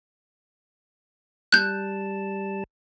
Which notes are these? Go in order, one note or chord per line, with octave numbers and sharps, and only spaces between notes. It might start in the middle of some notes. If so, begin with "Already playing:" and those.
G3 A5 F#6 G6